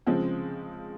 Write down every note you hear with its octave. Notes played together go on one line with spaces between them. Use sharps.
C#3 F3 G#3 C4